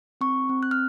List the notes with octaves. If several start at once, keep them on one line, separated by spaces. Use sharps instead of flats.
C4 C#6
C4
F#6
F6